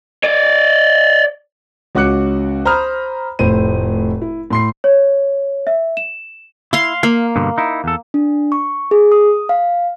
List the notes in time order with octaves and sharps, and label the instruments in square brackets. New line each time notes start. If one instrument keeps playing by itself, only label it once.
[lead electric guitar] C#5 D5
[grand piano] C#2 C#4 F#4 D6 F#6 C#7
C5 A#5 B5 D#6 F6
F1 A2 C5 D#7
E4
A2 C6 C7
[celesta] C#5
E5
E7
[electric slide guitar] E4 [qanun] F5 C6
[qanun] A#3 [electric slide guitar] F5
[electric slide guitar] G2 B2 D3
D#4 E4
E2 A4
[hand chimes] D4
C#6
G#4
D#6
F5